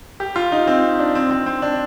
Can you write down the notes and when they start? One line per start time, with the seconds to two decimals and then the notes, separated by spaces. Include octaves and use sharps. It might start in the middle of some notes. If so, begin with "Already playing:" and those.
0.20 G4
0.36 F4
0.52 D#4
0.67 C4
0.99 D4
1.15 C4
1.31 C4
1.46 C4
1.62 D4